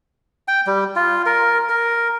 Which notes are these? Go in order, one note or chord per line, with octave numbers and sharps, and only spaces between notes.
G5
G3
F4
A#4
A#4